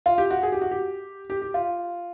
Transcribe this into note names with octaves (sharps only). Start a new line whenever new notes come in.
F4
G4
F#4
G#4
G4
F#4
G4
G4
G4
F4